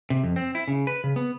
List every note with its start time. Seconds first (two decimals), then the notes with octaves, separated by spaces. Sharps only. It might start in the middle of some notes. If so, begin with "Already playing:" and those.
0.10 C3
0.24 F2
0.36 C4
0.55 E4
0.68 C#3
0.87 B4
1.04 C#3
1.16 B3